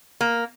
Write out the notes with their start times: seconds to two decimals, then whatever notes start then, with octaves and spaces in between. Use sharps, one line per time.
0.21 A#3